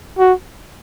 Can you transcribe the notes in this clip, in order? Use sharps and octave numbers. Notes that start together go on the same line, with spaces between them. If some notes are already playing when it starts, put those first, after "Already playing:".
F#4